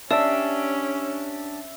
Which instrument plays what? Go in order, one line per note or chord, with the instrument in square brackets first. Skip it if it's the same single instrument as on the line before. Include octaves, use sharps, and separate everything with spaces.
[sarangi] C#4 [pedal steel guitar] D4 G4 [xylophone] D5 A5 [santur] E5